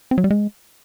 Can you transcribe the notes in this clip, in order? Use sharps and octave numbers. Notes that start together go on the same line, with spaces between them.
C4
F#3
G3
G#3